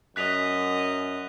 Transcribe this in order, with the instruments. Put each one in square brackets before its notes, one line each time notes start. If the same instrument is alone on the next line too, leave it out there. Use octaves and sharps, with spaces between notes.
[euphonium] F#2 [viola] D#5 [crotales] F#6 B6 F7